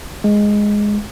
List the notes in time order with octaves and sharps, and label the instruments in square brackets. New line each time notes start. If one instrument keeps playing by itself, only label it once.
[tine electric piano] G#3